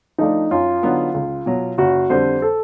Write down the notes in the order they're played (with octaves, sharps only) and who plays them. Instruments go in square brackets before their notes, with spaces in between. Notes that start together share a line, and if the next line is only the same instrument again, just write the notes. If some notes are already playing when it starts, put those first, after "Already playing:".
[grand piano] F3 A3 D4 [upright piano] D#4
[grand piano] F#2 [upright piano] F4
[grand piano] D3 F#3 B3 D#4
C#2
B2 F#3
[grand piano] F#1 [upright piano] F#4
[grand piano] F2 D3 G3 [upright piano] C5
[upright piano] A4